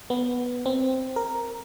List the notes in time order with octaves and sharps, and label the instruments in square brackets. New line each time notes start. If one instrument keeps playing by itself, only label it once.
[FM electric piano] B3
C4
A#4